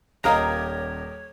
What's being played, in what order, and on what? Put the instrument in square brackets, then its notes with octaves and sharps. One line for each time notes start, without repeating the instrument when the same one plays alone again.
[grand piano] D#1 [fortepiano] G4 A#4 D#5 [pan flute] C#5 [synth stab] F5 A#5